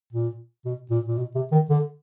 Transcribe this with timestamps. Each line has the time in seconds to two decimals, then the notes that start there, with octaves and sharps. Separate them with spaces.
0.13 A#2
0.65 B2
0.90 A#2
1.08 A#2
1.18 B2
1.35 C3
1.52 D#3
1.70 D3